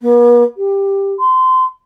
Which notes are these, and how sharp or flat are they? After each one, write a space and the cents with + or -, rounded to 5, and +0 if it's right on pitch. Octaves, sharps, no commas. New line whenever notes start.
B3 -45
G4 +10
C6 -25